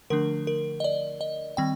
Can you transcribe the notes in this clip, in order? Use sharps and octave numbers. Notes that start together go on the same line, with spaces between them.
D3 F3 A3 D4 A#4
A#4
D#5
D5
D#5
D#3 G3 C4 G5